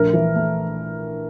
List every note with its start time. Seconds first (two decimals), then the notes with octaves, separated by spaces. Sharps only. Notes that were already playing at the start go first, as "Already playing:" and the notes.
Already playing: A#1 A3 A#4
0.13 E3
0.36 A3